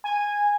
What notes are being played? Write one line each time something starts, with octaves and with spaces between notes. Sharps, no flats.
G#5